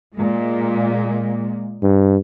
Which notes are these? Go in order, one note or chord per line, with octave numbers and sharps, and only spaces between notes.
A#2 G#3
G2